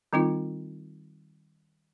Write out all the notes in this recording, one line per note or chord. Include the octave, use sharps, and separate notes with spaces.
D#3 G3 C4 D#4 F4